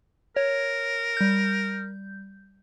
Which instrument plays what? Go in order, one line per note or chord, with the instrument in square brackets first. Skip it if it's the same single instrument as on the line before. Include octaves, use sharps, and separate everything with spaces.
[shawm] A#4 [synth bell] C#5
[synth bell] G3 G6